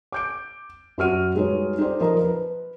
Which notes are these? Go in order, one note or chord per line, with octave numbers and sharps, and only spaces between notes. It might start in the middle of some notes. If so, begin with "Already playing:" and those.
D6 G6 D7
F#2 F#4 F6 D#7
G3 G#3 D#4 F#4 B4 C#5
D#4 G4 A4 C5 D5
F3 A#4 D#5 A#5
B4